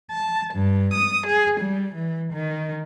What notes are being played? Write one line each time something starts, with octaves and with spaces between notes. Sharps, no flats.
A5
G2
D#6
G#4
G3
E3
D#3